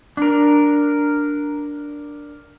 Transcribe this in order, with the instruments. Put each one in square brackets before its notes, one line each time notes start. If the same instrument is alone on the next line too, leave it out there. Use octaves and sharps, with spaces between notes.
[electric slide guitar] D4 A#4